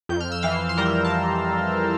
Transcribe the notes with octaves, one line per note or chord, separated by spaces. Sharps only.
F2 G6
F6
E6
E3 F5 F6
C6
G3 A#4 A#5
A5